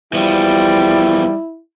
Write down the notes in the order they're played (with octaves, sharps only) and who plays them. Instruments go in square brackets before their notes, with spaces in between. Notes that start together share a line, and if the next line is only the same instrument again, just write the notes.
[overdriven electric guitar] E2 F3 [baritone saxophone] G3 [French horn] E4